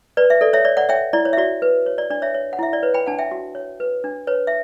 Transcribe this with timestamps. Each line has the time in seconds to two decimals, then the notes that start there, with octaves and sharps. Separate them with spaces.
0.17 B4 D5
0.30 E5
0.41 A4 D5
0.53 C#5 E5
0.65 C#5 D5
0.77 D5 F#5
0.89 C#5 E5 G5
1.13 E4 D5
1.25 C#5
1.33 E5
1.38 F#4 D5
1.62 B4
1.86 C#5
1.98 D5
2.10 D4 D5
2.22 C#5 E5
2.34 C#5
2.53 F#5
2.59 E4 E5
2.73 D5
2.83 B4 C#5
2.94 G5 B5
3.06 D4 F#5 A5
3.19 E5 G5
3.31 F#4
3.55 C#5
3.80 B4
4.04 D4
4.27 B4 C#5
4.47 E5